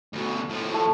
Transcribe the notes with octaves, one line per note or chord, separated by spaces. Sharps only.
D2 B2
A2 F3
A3